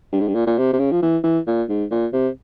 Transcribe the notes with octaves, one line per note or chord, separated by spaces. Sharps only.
G2
G#2
G2
A#2
A#2
C3
C3
C#3
F3
E3
E3
A#2
G#2
A#2
C3